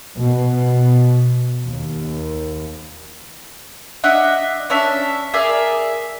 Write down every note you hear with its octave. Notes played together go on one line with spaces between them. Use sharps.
B2
D#2
D4 D#5 E5 F#5
C#4 D4 E5
G#4 A#4 D5 E5